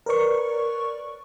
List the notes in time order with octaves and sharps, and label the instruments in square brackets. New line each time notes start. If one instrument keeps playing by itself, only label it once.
[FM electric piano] A#4 B4 C#5 D5 C#6